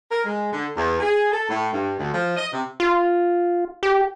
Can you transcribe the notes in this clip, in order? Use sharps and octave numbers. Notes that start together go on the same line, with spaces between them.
A#4
G#3
D3
E2
G#4
A4
A2
G2
D2
F3
D#5
C3
F4
G4